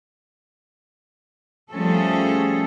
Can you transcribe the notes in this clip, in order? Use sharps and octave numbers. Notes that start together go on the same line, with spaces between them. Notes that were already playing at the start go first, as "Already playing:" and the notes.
F3 G3 A3 C#4 G#4 A4